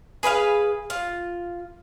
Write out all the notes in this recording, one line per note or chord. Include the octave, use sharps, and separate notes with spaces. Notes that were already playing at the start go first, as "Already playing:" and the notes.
G#4 B4 D5 F5
F4